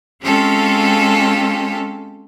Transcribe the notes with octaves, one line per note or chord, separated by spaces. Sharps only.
G#3 C4 C#4 F4 G4 A4